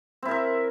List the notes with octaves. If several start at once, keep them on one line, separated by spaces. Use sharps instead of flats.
C4 E4 A#4 E5